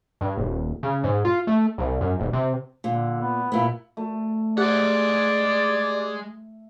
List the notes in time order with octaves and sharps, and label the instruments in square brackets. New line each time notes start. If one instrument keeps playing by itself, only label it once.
[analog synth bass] G2
D#1
C#3
G#2
F4
A3
C2
F#2
D#1
C3
[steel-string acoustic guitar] A#2 [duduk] D3
[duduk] B3
[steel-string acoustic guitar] A#2 B3 [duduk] E4
[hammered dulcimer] A3
[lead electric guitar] G#3 F#5 [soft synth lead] G4 [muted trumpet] D5